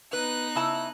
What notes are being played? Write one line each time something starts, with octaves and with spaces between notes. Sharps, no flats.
B3 D#4 B4 F#6
C#3 E4 A5